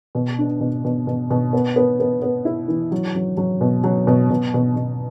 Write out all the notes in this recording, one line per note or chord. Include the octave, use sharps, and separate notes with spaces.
B2
D4
B2
B2
B2
B2
B3
B3
B3
B3
E4
E3
F#3
F#3
F#3
B2
F#3
B2
B2
B2
B2